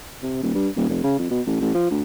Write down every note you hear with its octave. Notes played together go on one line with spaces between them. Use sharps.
C3
D#1
G2
D#1
F1
C#3
F2
B2
A1
A1
F3
D2